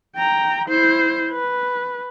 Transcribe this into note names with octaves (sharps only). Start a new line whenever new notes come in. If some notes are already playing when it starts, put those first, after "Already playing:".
G5 A#5
E4 C5
B4